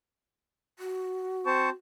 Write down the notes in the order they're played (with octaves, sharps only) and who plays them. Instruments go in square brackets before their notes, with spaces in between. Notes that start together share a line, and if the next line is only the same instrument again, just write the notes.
[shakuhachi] F#4
[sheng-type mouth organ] C4 C5 A5 [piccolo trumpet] C#6